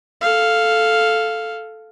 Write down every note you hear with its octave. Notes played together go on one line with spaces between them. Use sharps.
A4 F5